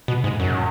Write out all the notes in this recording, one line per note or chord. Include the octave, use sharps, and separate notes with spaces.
B2
G#2
F#2